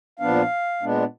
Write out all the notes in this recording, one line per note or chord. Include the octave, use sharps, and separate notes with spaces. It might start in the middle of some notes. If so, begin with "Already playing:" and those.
A#2 F3 B3 D4 F5
A#2 G#3 B3 D4